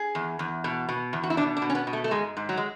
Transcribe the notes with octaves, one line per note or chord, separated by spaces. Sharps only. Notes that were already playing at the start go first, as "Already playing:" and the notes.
Already playing: G#4
E2
E2
B2
B2
E2
F#4
E4
B2 D4
D4
B2
C#4
B3
B2
A3
A3
G#2 G#3
G#2
F#3
G#3